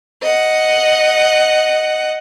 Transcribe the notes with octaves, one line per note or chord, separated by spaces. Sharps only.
D#5 F#5